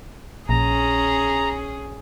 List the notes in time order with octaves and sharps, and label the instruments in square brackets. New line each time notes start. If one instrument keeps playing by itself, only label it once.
[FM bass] A#1 [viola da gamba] C#4 G#4 [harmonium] A#5